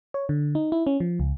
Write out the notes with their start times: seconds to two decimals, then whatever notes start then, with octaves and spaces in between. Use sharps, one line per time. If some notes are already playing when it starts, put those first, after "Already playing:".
0.14 C#5
0.29 D3
0.55 D#4
0.72 E4
0.87 C#4
1.00 F3
1.20 C#2